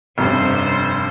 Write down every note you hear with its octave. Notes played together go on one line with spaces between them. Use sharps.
F1 G2 C#4 C5